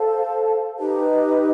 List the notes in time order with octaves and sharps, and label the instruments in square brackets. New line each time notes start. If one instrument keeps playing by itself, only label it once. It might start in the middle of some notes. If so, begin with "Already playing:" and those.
Already playing: [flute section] A4 C5 F5 A5
D#4 G4 B4 D#5